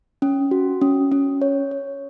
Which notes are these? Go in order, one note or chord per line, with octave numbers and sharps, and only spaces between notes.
C#4
F#4
C#4
C#4
C#5
C#5